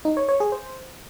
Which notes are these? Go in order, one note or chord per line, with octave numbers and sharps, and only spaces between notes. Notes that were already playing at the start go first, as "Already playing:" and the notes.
D#4
C#5
C#5
G#4
C5